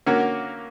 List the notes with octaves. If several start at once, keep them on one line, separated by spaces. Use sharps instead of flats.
D3 A#3 C#4 F#4 A#4